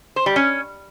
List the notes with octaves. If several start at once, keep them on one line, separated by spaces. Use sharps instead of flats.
C5
G3
C#4